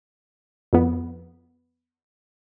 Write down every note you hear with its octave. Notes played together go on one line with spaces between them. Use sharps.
F2 B3